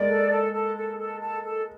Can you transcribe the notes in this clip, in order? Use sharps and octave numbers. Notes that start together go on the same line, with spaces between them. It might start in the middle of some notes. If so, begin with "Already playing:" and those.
Already playing: G#3 A#3 D5
A4
A4
A4
A4
A4
A4
A4